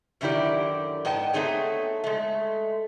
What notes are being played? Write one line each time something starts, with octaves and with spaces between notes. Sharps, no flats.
F#2 D3 D#3 E4 G4 D5
G#2 B3 D#5 G5 A5
A3 B3 C4 D#4 G#4 C#5
G#3 A3